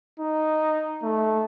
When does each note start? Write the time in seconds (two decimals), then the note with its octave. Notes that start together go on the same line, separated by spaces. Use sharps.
0.20 D#4
1.03 A3